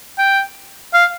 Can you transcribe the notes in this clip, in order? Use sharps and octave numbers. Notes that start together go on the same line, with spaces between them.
G5
F5